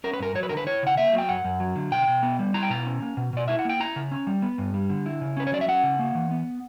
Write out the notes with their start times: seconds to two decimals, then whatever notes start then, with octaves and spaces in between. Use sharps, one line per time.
0.04 C#4 A#4
0.13 B4
0.19 G2 A#4
0.35 F#3 C#5
0.43 B4
0.49 D3 A#4
0.57 B4
0.67 E4 C#5
0.83 C#3 F#5
0.97 A#3 E5
1.13 F#3
1.18 G5
1.29 F#2 F#5
1.44 F#2
1.60 F#3
1.76 D3
1.92 B2 G5
2.08 B2
2.23 B3
2.39 G3
2.54 E4 A#5
2.63 G5
2.70 B2 A#5
2.86 C#4
3.02 A#3
3.17 B2
3.33 B2 D5
3.48 E4 E5
3.59 F#5
3.65 A#3 G5
3.80 E4 A#5
3.96 C#3
4.11 C#4
4.27 G3
4.42 B3
4.58 G2
4.74 G3
4.90 D3
5.06 E4
5.21 C#3
5.37 C#4 B4
5.47 C#5
5.52 F#3 D5
5.61 E5
5.68 C#4 F#5
5.83 C#3
5.99 A#3
6.15 E3
6.31 B3